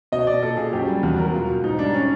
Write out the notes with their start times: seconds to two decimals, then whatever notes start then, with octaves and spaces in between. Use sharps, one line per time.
0.12 B2 D#5
0.27 B2 D5
0.42 A#2 A4
0.57 A#2 G#4
0.73 F#2 G4
0.88 G3
1.03 E2 F#4
1.18 F#3 A#4
1.33 B2 F4
1.49 B2
1.64 G#2 D#4
1.79 G3 D4
1.94 C#4